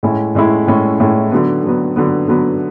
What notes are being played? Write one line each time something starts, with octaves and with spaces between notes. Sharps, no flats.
A2 G#3 C#4 E4
A2 G#3 C#4 E4
A2 G#3 C#4 E4
A2 G#3 C#4 E4
D3 F#3 B3
D3 F#3 B3
D3 F#3 B3
D3 F#3 B3